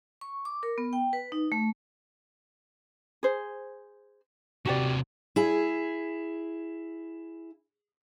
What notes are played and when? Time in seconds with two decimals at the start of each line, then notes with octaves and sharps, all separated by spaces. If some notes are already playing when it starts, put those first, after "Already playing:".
0.21 C#6
0.45 D6
0.63 A#4
0.78 B3
0.93 G5
1.13 B4
1.32 D#4
1.52 A3
3.23 G#4 C5
4.66 C3 F#3 F#4 G4 D5
5.36 E4 G#4